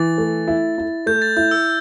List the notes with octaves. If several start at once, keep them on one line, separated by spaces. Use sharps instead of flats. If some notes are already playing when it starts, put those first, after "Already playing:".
Already playing: E3 A6
A3
E4
E4
A3 G6
A6
E4 G6
E6